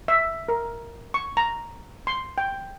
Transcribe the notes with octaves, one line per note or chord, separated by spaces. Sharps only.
E5
A#4
C#6
A#5
C6
G5